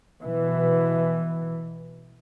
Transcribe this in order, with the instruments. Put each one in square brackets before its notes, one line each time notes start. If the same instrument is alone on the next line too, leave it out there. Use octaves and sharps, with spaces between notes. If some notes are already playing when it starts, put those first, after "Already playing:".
[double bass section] B2 E3